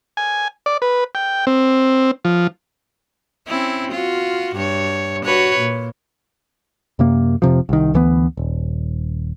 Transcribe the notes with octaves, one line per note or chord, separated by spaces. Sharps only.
G#5
D5
B4
G5
C4
F3
C4 C#4 E4
F4 F#4
G2 C#5
F#4 B4 C#5
A#2
F#2 C3 A#3
F1 C3 F3
C2 D#3
D2 E3 B3
D#1